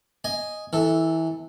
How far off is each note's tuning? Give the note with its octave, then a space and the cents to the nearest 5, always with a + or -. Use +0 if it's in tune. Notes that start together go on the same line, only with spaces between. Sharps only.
D#5 +0 G#5 +0
E3 -20 A4 +0